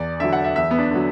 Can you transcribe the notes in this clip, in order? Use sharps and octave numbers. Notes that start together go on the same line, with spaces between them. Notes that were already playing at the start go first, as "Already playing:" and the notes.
Already playing: E2 D5
D3 F#3 E5
F#5
E5
E2 E5
B3
D4
D3 F#3